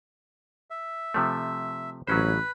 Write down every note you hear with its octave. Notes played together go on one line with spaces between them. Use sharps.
E5
C3 F3 A3
A1 F#3 C#4 B4 C5 B5